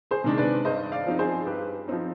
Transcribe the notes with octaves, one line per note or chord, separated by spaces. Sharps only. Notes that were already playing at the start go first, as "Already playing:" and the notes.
G#4 C5
C3 D#3 G#3 D4
B4 D5
G2 C5 D#5
D5 F5
F3 C4 D#4
G#4 C5
G2 G4 B4
F3 C4 D#4